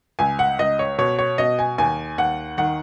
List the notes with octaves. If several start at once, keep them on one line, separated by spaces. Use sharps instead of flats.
C#2 G#5
F#5
C#2 D#5
C#5
B2 C#5
C#5
B2 D#5
G#5
D#2 G#5
D#2 F#5
D#3 F#5